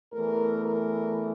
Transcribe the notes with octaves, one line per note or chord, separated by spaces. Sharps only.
E2 E3 A3 A#4
A#4